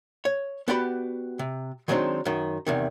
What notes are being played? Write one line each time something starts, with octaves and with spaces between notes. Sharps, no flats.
C#5
B3 F#4 G4 D5 B5
C3
D#3 F#3 G#3 C4 D4 D#4
F#2 D#3
E2 C3 D#3